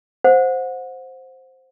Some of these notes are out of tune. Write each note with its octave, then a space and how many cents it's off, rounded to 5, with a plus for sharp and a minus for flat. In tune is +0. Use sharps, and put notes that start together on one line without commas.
C5 +0 F#5 -30